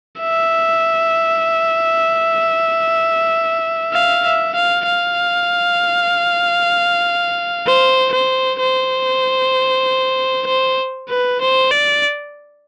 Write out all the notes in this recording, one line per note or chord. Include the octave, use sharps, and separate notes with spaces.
E5
F5
E5
F5
F5
C5
C5
C5
C5
B4
C5
D5